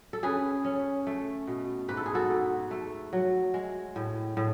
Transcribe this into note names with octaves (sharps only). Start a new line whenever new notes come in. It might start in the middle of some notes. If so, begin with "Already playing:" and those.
A4
C#4 G#4 B4
C#4
A3
B2
G#2 B4
A4
G#4
F#4 A4
G#2
A3
F#3
G#3
A2
A2